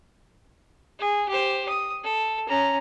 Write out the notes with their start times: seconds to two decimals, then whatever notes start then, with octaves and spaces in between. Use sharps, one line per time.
0.99 G#4
1.28 G4 C5
1.69 D#6
2.03 A4
2.48 C#4 A#5